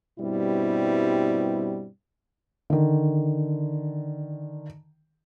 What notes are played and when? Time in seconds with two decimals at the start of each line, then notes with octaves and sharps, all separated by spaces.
0.19 G2 B2 G3 C4 E4
2.70 D3 D#3